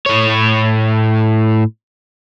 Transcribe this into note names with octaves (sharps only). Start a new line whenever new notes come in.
A2 C#5